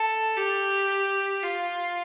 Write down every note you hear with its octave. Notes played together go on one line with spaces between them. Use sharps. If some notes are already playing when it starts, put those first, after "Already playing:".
Already playing: A4
G4
F4